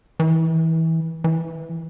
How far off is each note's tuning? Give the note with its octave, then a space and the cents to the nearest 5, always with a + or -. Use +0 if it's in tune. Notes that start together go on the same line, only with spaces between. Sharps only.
E3 -25
E3 +0